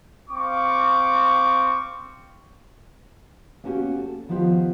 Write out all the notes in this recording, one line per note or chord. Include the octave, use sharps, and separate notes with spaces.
C4 F5 C#6 D6
A#3 B3 C#4 F#4 G4
A4
D#3 F3 B3 F4 G4